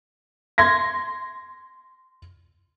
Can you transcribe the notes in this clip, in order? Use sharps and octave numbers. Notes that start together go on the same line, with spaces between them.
C6 G#6 A#6